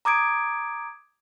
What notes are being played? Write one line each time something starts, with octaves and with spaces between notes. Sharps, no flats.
A#5 D6 D#6 G#6 D7